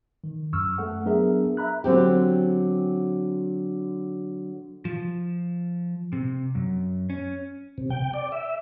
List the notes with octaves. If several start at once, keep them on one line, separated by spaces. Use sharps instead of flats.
D#3
F#2 C#6 E6 F6
A3 A4 F#5
F#3 B3 D4 G#4 A#4 E5
E5 A#5 B5 F#6
D3 F#3 C4 G4
F3
C3
F#2
C#4
C3
G5
D5
E5